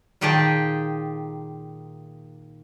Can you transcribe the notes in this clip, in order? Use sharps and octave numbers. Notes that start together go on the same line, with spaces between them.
A#2 D#3 G4 G#4 G5 A5